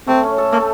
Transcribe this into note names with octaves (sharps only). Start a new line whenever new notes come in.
A3 C4
C#4
A4
A3 A#3